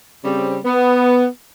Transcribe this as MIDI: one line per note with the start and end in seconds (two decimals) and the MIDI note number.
0.23 0.57 49
0.23 0.57 55
0.23 0.57 60
0.64 1.25 59